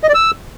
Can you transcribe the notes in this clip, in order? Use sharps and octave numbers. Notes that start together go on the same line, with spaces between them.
D#5
D5
E6